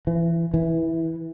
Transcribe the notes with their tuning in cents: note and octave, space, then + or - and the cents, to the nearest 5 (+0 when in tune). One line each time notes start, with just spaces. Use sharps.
E3 +25
E3 -10